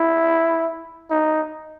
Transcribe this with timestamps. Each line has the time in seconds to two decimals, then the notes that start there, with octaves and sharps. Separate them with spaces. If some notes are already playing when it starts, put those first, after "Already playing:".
Already playing: E4
1.10 D#4